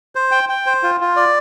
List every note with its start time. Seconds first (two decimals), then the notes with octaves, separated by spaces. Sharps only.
0.15 C5
0.32 G5
0.49 G5
0.66 C5
0.83 F4
1.01 F4
1.16 D5